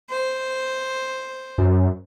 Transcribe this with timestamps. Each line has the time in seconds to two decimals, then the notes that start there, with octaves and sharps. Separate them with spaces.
0.11 C5
1.58 F#2